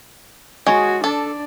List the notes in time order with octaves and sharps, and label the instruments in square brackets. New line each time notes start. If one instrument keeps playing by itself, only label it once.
[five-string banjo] G#3 C#5 [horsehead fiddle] F#4 G#4
[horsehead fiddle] D4 D5 [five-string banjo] A4